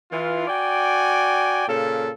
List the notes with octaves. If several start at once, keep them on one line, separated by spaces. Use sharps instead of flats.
E3 F4
F#4 D5 G5 G#5
A#2 C#3 A4